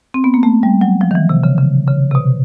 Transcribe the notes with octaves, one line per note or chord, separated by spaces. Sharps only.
C4
B3
A#3
A3
G3
F#3
F3
D#3
E3
C3
C#3
C#3
C#3
C3
B2